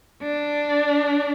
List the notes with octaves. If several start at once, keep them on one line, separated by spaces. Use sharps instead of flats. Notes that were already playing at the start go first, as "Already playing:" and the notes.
D4